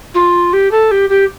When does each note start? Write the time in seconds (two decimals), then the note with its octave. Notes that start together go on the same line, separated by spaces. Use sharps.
0.15 F4
0.53 G4
0.71 A4
0.91 G4
1.10 G4